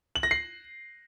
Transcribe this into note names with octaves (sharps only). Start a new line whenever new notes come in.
F#7
A#6
C7